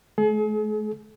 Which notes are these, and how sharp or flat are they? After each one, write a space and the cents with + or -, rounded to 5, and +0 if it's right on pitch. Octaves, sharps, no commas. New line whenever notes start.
A3 -45 G#4 +45